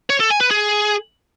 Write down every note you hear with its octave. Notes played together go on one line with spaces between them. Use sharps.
C#5
A4
G#5
B4
G#4